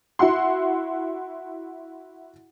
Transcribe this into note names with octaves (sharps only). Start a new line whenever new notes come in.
E4 F#4 F#5 C6